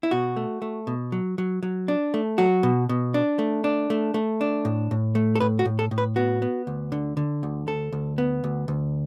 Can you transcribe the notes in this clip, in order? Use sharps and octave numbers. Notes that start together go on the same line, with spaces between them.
E4
B2 F#4
A3
A3
B2
F#3
F#3
F#3
D4
A3
F#3 F#4
B2
B2
D4
A3
D4
A3
A3
D4
A2
A2
A3
A4
A2 B4
F#4
A2
A4
A2
B4
B3 F#4
B3
D2
D3
D3
D2
D2 A4
D2
B3
D2
D2